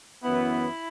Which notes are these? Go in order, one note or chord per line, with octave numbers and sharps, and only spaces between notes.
F#2 E3 B3 E4